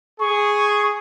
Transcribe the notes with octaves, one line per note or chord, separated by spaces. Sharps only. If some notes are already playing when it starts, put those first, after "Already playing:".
G#4 C#6